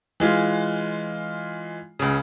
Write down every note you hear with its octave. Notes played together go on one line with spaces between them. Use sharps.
E3 G#3 F4
C#2 C#3